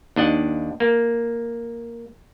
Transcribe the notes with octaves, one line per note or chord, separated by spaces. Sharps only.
D#2 D4 D#5 F#5
A#3